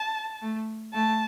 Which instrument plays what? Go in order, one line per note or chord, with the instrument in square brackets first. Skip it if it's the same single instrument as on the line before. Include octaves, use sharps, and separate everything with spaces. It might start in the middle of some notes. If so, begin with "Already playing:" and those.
Already playing: [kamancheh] A5
[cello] A3
[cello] A3 [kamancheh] A5